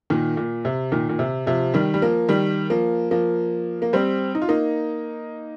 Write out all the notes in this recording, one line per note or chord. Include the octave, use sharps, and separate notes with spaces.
A#2 D#3
A#2
C3
A#2 D#3
A#2
C3
C3 F3
D#3 G3
G3
F3 A#3
D#3 G3
F3 A#3
F3 A#3
A#3
G3 C4
D#4
F4
A#3 D#4